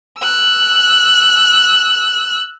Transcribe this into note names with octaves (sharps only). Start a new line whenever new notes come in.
E6 F#6